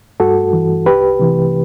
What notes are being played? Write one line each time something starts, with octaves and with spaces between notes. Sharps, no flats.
G2 F#4 A4
E3
C2 G4 B4
C3 E3